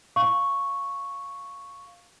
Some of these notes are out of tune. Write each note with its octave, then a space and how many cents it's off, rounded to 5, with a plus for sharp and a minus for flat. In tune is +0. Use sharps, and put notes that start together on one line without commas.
F5 +0 C#6 +0